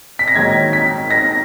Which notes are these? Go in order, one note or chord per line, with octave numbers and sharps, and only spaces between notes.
B6
A#6
A#1 G#2 D#3 F#3 G#6
B6
A#6